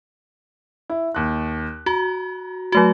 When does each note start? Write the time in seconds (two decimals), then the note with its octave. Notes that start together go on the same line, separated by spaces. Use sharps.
0.90 E4
1.15 D#2 F#6
1.86 F#4 A#5
2.72 F#3 A3 F#4